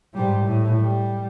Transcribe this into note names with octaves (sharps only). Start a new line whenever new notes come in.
G#2 G3
A2
G3